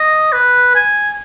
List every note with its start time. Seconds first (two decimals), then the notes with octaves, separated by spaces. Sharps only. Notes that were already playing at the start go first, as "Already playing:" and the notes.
Already playing: D#5
0.32 B4
0.75 G#5